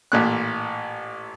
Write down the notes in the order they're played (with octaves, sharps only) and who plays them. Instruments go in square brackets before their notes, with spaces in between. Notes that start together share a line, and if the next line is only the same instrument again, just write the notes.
[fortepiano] A1 A#2 F#6